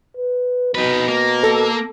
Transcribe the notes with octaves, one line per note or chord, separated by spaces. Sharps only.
B4
B2 D#4 B4
A#3
A4